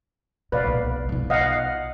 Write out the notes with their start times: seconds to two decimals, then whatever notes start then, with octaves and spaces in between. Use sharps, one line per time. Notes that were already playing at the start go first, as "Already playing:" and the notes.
0.52 A#2 B4 D5 F5
0.67 B1
1.09 B1 F4
1.30 D#5 F5 F#5